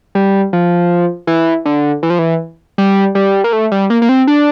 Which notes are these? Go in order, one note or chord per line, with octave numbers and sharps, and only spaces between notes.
G3
F3
E3
D3
E3
F3
E3
G3
G3
A#3
A3
G3
A#3
A#3
C4
D4